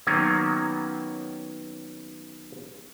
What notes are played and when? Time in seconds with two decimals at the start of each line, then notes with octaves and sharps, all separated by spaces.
0.07 D#3 F#3 A#3 B3 C#4